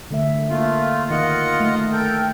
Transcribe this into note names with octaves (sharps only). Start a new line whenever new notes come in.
D3 A3 E5
A3 A#3 F4
D#3 F4 D#5 F#5
A3
A4 A#4 G5